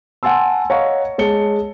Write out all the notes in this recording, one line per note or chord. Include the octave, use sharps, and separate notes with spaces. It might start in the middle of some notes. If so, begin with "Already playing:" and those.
F#5 G#5 A5 C6 E6
C#5 D#5 F5 F#5 A#5 C#6
G#3 C#5 A5 C#7 G7